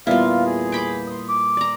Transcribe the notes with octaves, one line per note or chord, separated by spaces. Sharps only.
E2 A#2 G3 E4 F4 F5
G#4
G5 B5 D6
C6 D#6
D6
D5 A#5